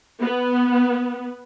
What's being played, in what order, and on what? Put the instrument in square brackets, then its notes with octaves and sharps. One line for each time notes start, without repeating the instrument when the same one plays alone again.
[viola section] B3